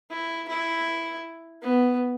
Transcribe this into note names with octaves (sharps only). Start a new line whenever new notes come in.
E4
E4
B3